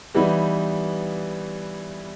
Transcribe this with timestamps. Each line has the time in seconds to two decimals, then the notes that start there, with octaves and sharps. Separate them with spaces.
0.15 E3 G3 B3 D#4 E4